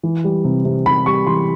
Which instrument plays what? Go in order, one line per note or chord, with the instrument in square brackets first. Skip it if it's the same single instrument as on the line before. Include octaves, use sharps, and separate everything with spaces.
[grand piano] E3
G3
C3
C3
C3 B5
G3 C#6
E3 C6